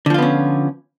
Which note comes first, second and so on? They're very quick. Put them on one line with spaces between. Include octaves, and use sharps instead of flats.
D3 F3 F4 B3 C#4